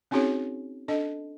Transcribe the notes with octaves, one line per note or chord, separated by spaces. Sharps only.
C4 C#4 D#4 F#4 G#4 C#5
D4 A4 D#5